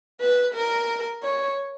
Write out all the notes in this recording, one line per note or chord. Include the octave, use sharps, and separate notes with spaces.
B4
A#4
C#5